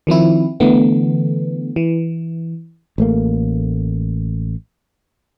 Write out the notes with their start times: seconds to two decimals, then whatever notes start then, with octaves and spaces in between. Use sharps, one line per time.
0.07 D#3 F3 C4 E4
0.60 D3 E3 A3 B3
1.76 E3
2.98 A1 A3 A#3